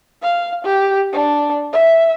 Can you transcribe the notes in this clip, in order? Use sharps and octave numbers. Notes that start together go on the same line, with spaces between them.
F5
G4
D4
E5